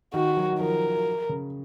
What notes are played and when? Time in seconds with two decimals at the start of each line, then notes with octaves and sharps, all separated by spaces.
0.14 D#3 F#4
0.37 F#3
0.52 D#3
0.60 F3 A#4
1.29 C#3